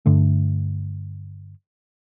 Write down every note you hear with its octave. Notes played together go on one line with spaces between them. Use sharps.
G2 D3 A3